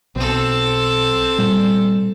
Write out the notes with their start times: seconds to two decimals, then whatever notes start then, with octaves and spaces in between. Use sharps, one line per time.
0.16 B1 C4 A4
1.38 A#2 G3